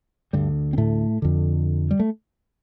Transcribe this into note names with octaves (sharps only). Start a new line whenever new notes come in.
D2 G2 D3 G3
C4
A2 A3
F2 D3
G3
A3